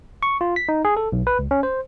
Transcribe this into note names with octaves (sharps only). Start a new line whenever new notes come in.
C#6
F4
B6
D#4
G#4
A4
B1
B4
C#2
C#4
C5